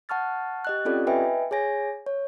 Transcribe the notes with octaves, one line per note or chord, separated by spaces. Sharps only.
F#5 A5 C#6 F6 A6
G4 D#5 F#6
C4 C#4 F4 G4 A4 D5
B4 D#5 E5 G5 G#5
G#4 C#5 G#5 A#6
C#5